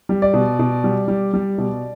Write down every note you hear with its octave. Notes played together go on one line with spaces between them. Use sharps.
G3
D5
B2
B2
G3
G3
G3
B2